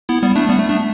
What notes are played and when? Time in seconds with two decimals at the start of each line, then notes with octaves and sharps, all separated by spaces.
0.09 B3 E4
0.22 G3 B3
0.36 A3 D4
0.49 G3 B3
0.59 A3
0.69 A3 D4